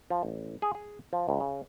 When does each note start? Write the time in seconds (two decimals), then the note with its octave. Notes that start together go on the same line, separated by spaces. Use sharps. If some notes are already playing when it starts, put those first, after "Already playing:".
0.10 F3
0.23 A1
0.62 G#4
0.75 G#4
1.13 F3
1.29 C#2
1.40 C#3